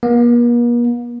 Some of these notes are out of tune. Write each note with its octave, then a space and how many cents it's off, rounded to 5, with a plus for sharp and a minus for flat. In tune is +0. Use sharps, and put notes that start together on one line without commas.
A#3 +45